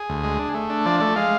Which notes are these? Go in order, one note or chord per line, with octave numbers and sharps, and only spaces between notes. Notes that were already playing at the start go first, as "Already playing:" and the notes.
Already playing: G#4
D2
G#3
D4
A3
D4
F3 D5
A3 D5
G#3 F5